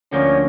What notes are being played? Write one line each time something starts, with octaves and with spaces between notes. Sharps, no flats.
D2 D3 F3 A#3 C#4